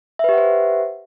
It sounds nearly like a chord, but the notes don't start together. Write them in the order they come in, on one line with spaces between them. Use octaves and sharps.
E5 B4 G4 F#5 C5